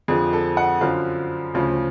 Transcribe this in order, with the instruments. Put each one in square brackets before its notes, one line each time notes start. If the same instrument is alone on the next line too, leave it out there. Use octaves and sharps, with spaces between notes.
[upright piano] F2 D3 F3 G#4
A4
F#5
F#2 D3 F3 F5
D2 C#3 F3